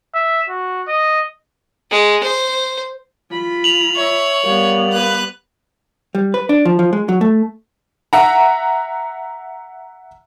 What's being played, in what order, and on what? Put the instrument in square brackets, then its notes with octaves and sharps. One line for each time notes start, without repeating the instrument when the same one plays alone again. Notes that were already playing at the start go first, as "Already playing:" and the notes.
[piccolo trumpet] E5
F#4
D#5
[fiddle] G#3
C5
[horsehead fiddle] F4 B5
[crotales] F7 F#7
[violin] C#5 [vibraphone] E5 E6
[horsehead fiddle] G3 B3 [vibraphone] A#4 F5
[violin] B4 F#6
[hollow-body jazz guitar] G3
B4
D4
F3
F3
G#3
F#3
A3
[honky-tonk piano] E5 F#5 A#5